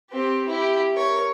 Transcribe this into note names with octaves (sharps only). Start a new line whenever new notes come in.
C4 G4
E4 G4
A#4 C#5